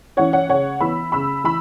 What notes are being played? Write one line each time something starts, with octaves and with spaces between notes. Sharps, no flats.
E3 C#4 C#5 F#5
C#5 F#5
C#3 C#5 F#5
E3 B3 B5 E6
C#3 B5 E6
E3 B5 E6